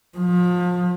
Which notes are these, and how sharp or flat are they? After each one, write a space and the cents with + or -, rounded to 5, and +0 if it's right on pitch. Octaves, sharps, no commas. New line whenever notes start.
F3 +35